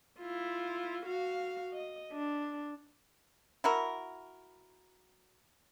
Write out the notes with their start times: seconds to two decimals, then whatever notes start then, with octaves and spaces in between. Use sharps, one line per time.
0.19 E4 F4
1.06 F#4 F5
1.73 D#5
2.13 D4
3.64 E4 F#4 A#4